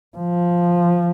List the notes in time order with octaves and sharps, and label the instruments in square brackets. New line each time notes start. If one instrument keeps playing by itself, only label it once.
[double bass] F3